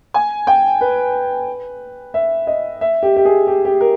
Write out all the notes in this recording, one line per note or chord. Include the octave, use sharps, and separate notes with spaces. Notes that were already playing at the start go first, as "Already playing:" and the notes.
G#5
G5
B4
E5
D#5
E5
G4
G4
G#4
G4
G4
A#4